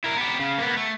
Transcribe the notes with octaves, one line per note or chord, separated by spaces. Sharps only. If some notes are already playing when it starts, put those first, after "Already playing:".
E4 A#4
B3 G4
C#3
A#3 B3
A3